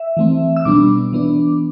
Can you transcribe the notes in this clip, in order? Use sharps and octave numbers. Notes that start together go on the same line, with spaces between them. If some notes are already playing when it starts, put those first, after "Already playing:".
Already playing: E5
E3 A3 C4
E6
B2 G3 B3 D4 D6
E3 B3 D4